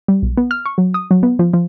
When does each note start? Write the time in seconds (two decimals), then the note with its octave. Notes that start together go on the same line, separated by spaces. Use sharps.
0.08 G3
0.22 B1
0.37 B3
0.51 F6
0.66 C#6
0.78 F#3
0.94 D#6
1.11 F#3
1.23 B3
1.39 F3
1.54 F3